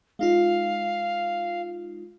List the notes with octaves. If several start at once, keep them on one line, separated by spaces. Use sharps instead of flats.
G#3 D#4 F4 F5